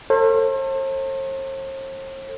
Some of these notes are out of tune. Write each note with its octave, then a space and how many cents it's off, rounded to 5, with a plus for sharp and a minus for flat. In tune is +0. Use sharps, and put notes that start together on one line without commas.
A4 +35 C5 +45